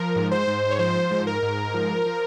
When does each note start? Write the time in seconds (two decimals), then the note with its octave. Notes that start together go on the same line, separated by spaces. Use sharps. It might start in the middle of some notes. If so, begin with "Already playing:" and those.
Already playing: F3 A#4
0.16 G#2
0.31 C5
0.47 G#2
0.71 C#5
0.79 F3 C5
1.11 G#2
1.27 A#4
1.42 G#2
1.74 F3
2.06 F3